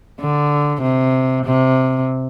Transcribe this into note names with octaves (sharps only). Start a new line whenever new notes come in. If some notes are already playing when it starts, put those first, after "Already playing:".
D3
C3
C3